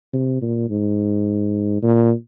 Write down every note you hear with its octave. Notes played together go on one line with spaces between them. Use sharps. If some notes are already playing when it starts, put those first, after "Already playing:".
C3
A#2
G#2
A#2